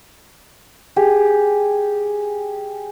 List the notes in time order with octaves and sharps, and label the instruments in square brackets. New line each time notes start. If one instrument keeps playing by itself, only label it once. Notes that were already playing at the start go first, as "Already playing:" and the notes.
[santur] G4 G#4